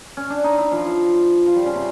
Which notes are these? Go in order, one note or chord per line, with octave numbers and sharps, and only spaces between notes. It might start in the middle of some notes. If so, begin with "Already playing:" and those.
C#4
D4
D#4
E4
F3 F4
F3 F4
G3 G4
C#3 C#4
C3 C4